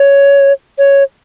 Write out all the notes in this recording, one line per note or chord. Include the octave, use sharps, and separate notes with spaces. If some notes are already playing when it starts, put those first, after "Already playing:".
Already playing: C#5
C#5